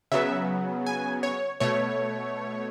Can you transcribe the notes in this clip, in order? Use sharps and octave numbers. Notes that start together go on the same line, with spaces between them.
C#3 F#3 B3 E5
G#5
C#5
B2 A3 C#5